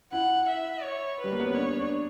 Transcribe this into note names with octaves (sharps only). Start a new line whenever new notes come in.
E4 F#5
E5
C#5
G3 B4
A#3
B3
C#4
D4 C#5
D4